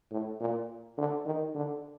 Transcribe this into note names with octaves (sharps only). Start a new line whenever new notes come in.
A2
A#2
D3
D#3
D3